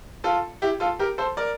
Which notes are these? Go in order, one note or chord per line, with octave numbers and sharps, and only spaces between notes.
F4 A4
E4 G4
F4 A4
G4 A#4
A4 C5
A#4 D5